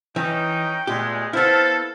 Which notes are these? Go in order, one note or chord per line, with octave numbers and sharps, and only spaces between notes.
E3 C#4 D#4 G5
A#2 G#3 A3 B3 G4
B3 E4 A4 C5 F5 F6